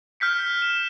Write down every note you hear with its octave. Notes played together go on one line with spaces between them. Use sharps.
F6 G6 B6 C#7
E7